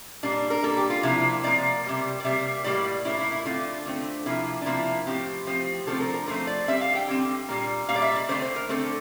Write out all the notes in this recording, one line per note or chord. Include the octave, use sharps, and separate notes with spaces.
A#2 G3 A#3 D4
A#4
A#2 G3 A#3 A4
G4
F4
C3 F3 A#3 E4
C3 F3 A#3 D5
C3 G3 A#3
D5
C3 G3 A#3 E5
A2 G3 A#3 D5
A2 G3 A#3 E4
E4
E4
D3 A3 C4 F4
D3 A3 C4
C3 F3 A#3 E4
D4
C3 F3 A#3 E4
A2 F3 C4 G4
A2 F3 C4
D3 F3 A3 C4 A4
A#4
A#4
D3 F3 A3 C4 C5
D5
D3 G3 C4 E5
F5
G5
D3 G3 C4
A#2 G3 A#3
A#2 G3 A#3 F5
D5
E5
D5
D3 A3 C4 C5
C5
A#4
D3 A3 C4 A4